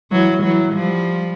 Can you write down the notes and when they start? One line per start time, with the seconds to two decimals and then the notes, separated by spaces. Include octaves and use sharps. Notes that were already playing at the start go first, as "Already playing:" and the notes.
0.11 E3 F#3
0.43 E3 F#3
0.73 F3 G3